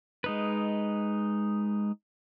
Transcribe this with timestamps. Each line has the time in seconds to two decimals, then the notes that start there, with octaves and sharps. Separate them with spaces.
0.24 G#3 D#4 B4